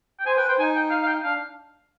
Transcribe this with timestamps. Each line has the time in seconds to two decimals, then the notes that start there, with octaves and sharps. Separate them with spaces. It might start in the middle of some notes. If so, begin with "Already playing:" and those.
0.20 G5
0.26 C5 G#5
0.37 B4 G5
0.48 C5 G5
0.59 D#4 G#5
0.75 G5
0.91 F5
1.03 F5
1.07 G5
1.23 D4 F5